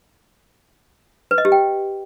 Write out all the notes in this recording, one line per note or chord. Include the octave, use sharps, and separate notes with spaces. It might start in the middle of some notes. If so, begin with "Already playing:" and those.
B4
D#5
G4
G5